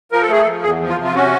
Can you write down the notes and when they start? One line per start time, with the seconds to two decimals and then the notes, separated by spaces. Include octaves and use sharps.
0.12 F3 A#4
0.22 A4
0.29 A3 G#4
0.42 A4
0.46 F3
0.63 E2 G#4
0.80 F3
0.89 F4
0.98 C3
1.05 F4
1.15 C#4 F#4